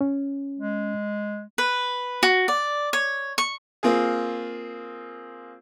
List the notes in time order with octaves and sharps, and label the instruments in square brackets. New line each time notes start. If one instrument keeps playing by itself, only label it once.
[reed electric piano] C#4
[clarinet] G#3
[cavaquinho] B4
F#4
D5
C#5
C#6
[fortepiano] A#3 C4 F4 G#4